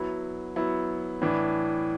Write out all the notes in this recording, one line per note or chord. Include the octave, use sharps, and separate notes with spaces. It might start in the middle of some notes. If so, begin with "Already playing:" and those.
Already playing: F#3 B3 E4
F#3 B3 E4
A2 E3 D4